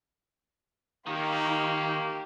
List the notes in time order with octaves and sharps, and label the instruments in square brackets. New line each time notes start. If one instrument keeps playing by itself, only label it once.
[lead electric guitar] D#3 [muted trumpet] A#3 [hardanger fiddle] D#4 F4 [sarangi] G4